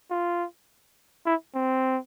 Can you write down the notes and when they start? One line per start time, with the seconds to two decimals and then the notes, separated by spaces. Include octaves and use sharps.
0.11 F4
1.26 E4
1.55 C4